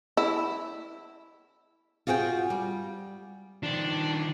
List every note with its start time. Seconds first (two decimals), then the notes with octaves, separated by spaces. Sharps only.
0.17 E4
2.07 F4 F#4 G#4 F#5 G5
2.50 G3
3.63 D#3 F3 D4